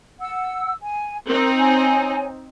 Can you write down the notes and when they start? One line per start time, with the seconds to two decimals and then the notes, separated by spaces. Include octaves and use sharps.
0.20 F#5 E6
0.81 G#5
1.28 C4 D#4 A#4
1.58 C#5 G#5